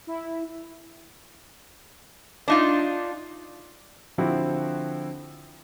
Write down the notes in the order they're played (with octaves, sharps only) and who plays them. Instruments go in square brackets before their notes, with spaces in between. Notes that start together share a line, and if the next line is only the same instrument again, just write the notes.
[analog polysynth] E4
[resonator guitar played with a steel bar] D4 D#4 F4
[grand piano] D3 F3 C4 E4 F#4